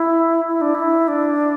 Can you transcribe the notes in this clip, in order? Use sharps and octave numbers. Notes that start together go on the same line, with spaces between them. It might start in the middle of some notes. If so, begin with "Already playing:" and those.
Already playing: E4
E4
D4
E4
D4